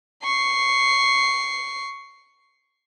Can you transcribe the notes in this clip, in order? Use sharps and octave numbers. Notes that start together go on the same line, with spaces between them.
C#6 C7